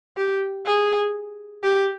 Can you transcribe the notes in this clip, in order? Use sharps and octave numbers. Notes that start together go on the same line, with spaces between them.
G4
G#4
G4